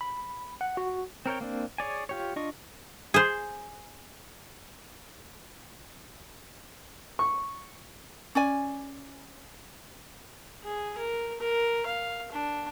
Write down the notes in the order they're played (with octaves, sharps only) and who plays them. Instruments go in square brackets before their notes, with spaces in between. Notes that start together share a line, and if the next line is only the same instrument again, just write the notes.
[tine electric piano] B5
F#5
F#4
[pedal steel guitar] C4 A#4 C#5 G5
A#3 C4 D4
G#4 C#5 D5 G#5
F4 G4 C#5
D4 F4 D#5 C#6
[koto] G#4 C5
[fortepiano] C#6
[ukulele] C#4 D5 G#5
[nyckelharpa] G#4
A#4
A#4
F5
D4